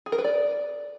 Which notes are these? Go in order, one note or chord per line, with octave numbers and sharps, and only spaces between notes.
G#4
A#4
B4
D5